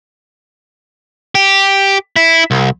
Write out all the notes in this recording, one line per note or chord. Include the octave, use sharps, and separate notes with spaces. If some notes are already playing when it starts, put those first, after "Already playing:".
G4
E4
C2